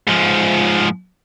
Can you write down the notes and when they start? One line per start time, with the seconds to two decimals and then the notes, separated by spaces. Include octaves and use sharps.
0.08 G#2 F3